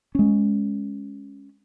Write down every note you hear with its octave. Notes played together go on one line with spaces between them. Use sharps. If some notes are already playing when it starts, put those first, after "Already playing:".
G#3 C#4